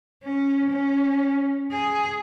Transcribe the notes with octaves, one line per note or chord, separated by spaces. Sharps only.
C#4
C#4
G#4